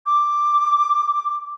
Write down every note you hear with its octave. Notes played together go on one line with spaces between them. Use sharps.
D6